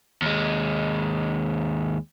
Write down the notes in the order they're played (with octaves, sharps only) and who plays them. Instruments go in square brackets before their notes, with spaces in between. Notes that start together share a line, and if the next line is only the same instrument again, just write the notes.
[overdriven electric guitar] D#2 G#3